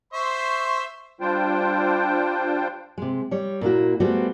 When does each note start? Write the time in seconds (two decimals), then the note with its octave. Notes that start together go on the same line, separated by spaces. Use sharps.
0.13 C5 E5 C6 C#6
1.21 G3 D4 F4 C5 G5
2.98 C3 G#3
3.31 G3 C#5
3.61 A#2 A#3 E4 F#4
4.00 G3 A3 B3 F#4 G#4 C5